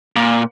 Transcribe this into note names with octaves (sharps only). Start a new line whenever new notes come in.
A#2